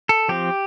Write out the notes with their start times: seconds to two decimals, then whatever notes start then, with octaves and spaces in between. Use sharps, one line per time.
0.09 A4
0.28 F3 C4 G4